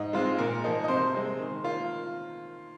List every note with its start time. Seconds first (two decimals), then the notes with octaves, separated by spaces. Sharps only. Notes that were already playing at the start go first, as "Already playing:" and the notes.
Already playing: G#2 D#5
0.13 G#3 C4 F4
0.38 A#2 A#4
0.64 F3 A#3 D#4
0.84 D#5
0.88 C3 C5
1.14 G#3 C4
1.39 D#3
1.64 A#3 F4